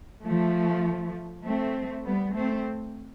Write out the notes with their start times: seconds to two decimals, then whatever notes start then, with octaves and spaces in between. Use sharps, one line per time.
0.25 F3 A3
1.44 A3 C4
2.04 G3 B3
2.34 A3 C4